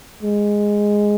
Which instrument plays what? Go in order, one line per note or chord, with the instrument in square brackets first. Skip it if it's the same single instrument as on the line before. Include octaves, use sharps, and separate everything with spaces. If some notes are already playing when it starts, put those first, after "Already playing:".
[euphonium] G#3